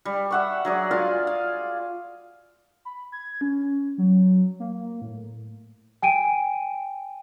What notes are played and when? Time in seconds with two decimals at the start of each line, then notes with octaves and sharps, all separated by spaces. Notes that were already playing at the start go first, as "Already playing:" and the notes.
0.05 G3
0.31 E5 F#5 C#6
0.65 F#3 G#4 D5
0.91 F4 D5 F5 G#5
1.27 F5
2.85 B5
3.12 G#6
3.41 C#4
3.98 F#3
4.60 A#3
5.02 A2
6.02 G5 G#5 D7 D#7